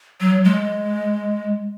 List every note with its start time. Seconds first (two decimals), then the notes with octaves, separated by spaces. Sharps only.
0.20 F#3
0.45 G#3